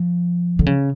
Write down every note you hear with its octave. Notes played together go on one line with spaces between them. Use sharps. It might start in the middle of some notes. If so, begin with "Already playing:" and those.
Already playing: F3
D3
C#3